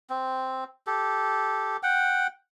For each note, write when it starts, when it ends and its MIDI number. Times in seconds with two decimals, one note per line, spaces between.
0.10 0.64 60
0.87 1.77 67
0.87 1.77 69
1.83 2.27 78
1.83 2.27 79